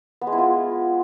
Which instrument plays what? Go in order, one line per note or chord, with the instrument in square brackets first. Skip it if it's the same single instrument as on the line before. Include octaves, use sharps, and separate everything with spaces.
[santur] B3
G#3
E4
F4